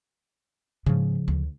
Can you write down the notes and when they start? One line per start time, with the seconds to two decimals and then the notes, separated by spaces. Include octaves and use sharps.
0.86 G#2 C#3 F3
1.28 D2